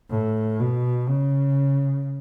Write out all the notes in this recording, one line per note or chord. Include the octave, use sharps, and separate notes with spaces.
A2
B2
C#3